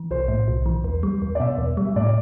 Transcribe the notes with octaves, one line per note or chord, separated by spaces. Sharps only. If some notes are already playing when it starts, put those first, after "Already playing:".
Already playing: E3
B1 C5
A2
B1
E3
E2
G3
E2
D5
B2 E5
E2
G3
E5
A2 D5